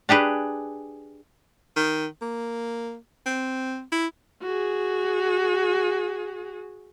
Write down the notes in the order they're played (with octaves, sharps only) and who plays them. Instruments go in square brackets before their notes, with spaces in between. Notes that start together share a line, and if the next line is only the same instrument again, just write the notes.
[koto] D4 G4 G#4 B4
[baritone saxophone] D#3
A#3
C4
E4
[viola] F#4 G#4